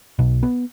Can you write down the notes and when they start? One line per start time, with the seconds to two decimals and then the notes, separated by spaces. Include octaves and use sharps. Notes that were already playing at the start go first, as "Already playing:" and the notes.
0.19 B1 B2
0.43 B3